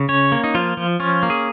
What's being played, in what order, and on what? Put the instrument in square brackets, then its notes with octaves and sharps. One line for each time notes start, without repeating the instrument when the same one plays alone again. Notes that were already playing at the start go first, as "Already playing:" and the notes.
Already playing: [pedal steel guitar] C#3
C#4 C#5
A#3
D#4
F3 F4
F3
C#4 F4
A#3
G#4